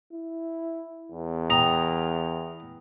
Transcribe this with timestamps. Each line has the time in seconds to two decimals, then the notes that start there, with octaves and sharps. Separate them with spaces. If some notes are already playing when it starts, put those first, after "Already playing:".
0.12 E4
1.11 E2
1.50 G5 A#5 D#6